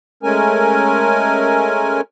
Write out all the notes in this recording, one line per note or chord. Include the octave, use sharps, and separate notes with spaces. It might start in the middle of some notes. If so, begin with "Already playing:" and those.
G#3 A3 C#4 A#4 G#5